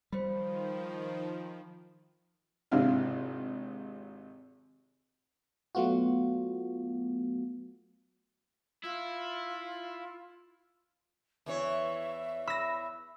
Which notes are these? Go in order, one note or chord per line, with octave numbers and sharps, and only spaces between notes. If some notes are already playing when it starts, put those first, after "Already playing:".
D#3 F3 G3 C5 B5
G#1 C3 D4 E4 F5
F#3 A3 B3 F4 F#4
E4 F4
E2 E3 C#5 E5
B5 E6 A#6